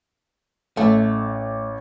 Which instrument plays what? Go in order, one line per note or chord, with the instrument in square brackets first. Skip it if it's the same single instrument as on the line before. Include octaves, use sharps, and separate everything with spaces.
[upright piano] A1 [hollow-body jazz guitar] A3